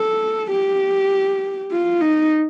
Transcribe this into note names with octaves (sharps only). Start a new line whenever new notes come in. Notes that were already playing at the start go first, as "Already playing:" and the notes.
Already playing: A4
G4
F4
D#4